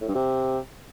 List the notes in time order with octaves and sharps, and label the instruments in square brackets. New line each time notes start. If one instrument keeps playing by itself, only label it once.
[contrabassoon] A2
G2
C3